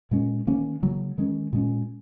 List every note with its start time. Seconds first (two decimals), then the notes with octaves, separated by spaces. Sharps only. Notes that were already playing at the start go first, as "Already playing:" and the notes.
0.11 A#2 G#3 C#4
0.47 D#3 A#3 C#4
0.83 C#3 F#3 A#3
1.18 D#3 G#3 C#4
1.53 A#2 G#3 C#4